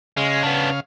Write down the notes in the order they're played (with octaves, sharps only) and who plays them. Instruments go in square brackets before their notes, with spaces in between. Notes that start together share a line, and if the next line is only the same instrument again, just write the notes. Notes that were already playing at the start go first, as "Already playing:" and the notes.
[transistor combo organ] C#3 F5 [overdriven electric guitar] G#3
[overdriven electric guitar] B3 D4